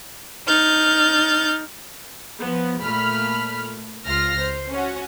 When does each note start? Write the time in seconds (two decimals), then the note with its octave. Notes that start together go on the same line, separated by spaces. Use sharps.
0.48 D#4 F6 G6 A6
2.40 F3 B3
2.81 A#2 A3 B5 F6
4.06 C#2 F4 F6 A#6
4.40 C5
4.72 C#4 F#4